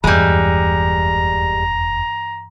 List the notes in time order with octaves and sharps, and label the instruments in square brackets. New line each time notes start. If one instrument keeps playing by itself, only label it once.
[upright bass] F1 E2 [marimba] G2 E3 [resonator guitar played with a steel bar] G3 G#3 [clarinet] A#5